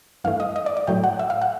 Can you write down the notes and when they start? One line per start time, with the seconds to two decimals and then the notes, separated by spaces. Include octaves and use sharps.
0.24 G2 E3 A3 F5
0.40 D#5
0.56 D#5
0.66 D5
0.77 D5
0.87 A2 F#3 A3 G5
1.04 F#5
1.19 E5
1.30 F5
1.42 F#5